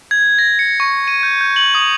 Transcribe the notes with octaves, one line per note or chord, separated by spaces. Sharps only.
G#6
A#6
C#7
C#6
D#7
G6
G6
F#7
D#6